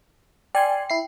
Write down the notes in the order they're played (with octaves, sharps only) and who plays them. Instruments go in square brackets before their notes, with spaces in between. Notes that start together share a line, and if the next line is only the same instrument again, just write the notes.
[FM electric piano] D5 G#5 C6 [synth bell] G5
[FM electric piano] E4 C7